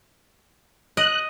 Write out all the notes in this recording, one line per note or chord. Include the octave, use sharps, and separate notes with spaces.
D#5 F#6